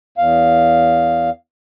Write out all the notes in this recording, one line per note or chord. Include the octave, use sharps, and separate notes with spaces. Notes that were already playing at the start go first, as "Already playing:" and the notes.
E2 F5